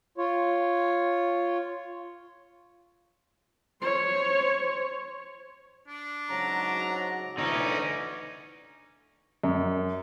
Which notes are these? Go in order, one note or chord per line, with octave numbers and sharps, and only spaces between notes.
F4 C#5
C5 C#5
D4
G#2 C#3 F#3 A#5
D2 D3 E3 C#4 D#4 D5
F#2